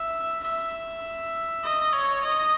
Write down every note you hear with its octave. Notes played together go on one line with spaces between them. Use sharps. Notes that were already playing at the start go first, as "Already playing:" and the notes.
Already playing: E5
E5
D#5
C#5
D#5